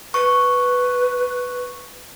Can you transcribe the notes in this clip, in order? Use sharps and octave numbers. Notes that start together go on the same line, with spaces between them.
B4 C#6